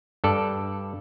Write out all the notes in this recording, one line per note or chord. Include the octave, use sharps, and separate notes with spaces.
G2 A4 D5